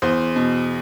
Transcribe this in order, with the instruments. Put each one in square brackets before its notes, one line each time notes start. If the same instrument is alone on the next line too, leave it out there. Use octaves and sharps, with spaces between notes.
[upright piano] E2 C5
B2